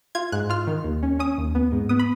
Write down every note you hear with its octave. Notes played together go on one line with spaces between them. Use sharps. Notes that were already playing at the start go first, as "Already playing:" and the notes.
F4 G#6
G#2 F#6
F4 F6
D#3
D#2
C#4
C#4 D#6
D#2
B3
G#2
B3 D#6
B5